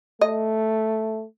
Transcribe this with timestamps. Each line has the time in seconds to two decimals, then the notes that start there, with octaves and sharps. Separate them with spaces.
0.21 A3 D#5